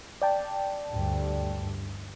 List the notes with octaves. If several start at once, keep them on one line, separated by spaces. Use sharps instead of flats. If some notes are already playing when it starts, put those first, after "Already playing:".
D5 G5 A5
D2 G2